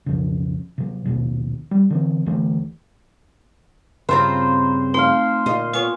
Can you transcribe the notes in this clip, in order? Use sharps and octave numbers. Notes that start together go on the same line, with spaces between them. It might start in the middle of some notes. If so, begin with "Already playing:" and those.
B1 F2 C#3
C3 F#3
A#1 D#2 B2
G3
D3 E3 C4
D2 D3 E3 A3
G2 C#3 C4 F4 C5 E5 A#5 B5
A3 D#4 C5 F5
D2 A#2 F4 D#5
B3 F4 C#5 G#5